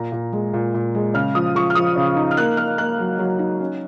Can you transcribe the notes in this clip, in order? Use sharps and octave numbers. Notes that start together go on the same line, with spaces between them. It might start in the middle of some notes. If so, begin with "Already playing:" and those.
Already playing: A#2 A#5
A#2
G#3
A#2
A#2
G#3
C#3 F6
F3 D#6
F3 C#6
F6
F3 D#6
C#3
D#4
F6
A#3 F#6
A#3 F6
A#3 F#6
F#3
F#3
D#4
C#4